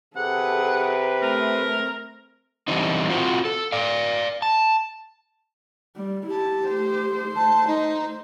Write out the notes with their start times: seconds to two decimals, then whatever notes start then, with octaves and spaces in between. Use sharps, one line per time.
0.16 C3 G#4 A4 B4 F#5
1.21 A3 C4 A#4
2.68 D3 E3 G3 C4 D#4
3.10 C4 F4 F#4 C5
3.45 A4
3.72 D5 F5
4.42 A5
5.96 G3
6.27 E4 G4 A5
6.69 A3 C5
7.35 A5
7.67 D#4